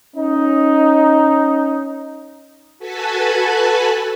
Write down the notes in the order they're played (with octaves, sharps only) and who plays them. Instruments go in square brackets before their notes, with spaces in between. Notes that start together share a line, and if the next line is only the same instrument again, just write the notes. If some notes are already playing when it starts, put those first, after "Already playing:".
[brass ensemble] C#4 D#4
[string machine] F#4 A4 B4 G#5 A5 B5